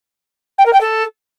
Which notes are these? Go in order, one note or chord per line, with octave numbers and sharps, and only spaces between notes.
G5
A#4
G5
A4